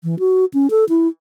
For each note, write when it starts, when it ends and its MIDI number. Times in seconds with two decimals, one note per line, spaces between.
0.04 0.18 52
0.19 0.45 66
0.54 0.70 61
0.70 0.85 69
0.89 1.08 64